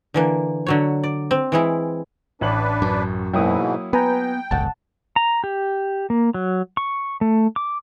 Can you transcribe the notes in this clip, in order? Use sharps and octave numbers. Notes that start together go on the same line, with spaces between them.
D3 E3 A#3
D3 F#3 C#5
D5
C4
E3 G#3 E4
A1 D4 B4 F#7
F#2
G#2 B2 E3 F#3 A#3 E4 G5 D#6
B3 B4 G5 G#5 A#5
D1 G1 C#2 F#5 A5
A#5
G4
A#3
F#3
C#6
A3
D6